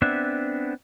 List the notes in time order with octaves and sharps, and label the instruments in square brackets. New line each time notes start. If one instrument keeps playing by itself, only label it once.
[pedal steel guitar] B3 C4 D4 E5